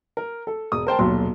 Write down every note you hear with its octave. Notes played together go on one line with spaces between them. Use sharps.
A#4
A4
E1 D#6
A#4 C5 G5 A5
D#1 B1 F#3 C6